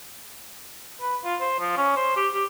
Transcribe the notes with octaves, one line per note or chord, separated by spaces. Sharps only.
B4
F4
C5
F3
C#4
C5
G4
G4